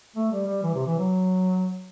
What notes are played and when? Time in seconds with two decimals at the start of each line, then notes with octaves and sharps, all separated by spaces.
0.16 A3
0.31 G3
0.47 G3
0.63 E3
0.74 C3
0.86 E3
0.99 F#3